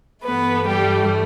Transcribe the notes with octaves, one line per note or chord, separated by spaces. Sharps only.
G2 E3 A3 B3 B4
G3 G4